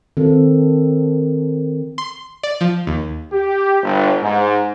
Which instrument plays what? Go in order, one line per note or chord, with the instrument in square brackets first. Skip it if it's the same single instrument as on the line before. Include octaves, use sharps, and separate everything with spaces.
[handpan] D#3 C4 A4
[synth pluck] C6
D5
F3
D#2
[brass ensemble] G4
G1
G#2